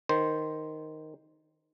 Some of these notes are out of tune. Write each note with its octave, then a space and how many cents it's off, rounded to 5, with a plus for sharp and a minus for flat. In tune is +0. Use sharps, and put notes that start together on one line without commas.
D#3 +0 C5 +0